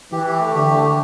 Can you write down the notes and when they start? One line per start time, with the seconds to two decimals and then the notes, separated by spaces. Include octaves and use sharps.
0.12 E3 G4
0.27 G4
0.40 A3
0.55 D3 G4
0.70 A3
0.84 G4